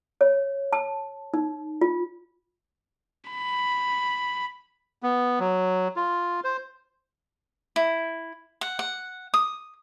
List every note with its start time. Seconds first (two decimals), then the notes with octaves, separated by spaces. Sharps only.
0.21 C#5
0.73 A5
1.34 D#4
1.81 F4
3.31 B5
5.03 B3
5.40 F#3
5.96 F4
6.44 C5
7.76 E4
8.61 F#5
8.79 F#5
9.34 D#6